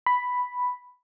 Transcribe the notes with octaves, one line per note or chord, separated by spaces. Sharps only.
B5